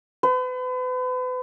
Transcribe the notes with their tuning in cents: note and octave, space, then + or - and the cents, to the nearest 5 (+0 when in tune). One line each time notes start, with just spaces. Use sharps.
B4 +40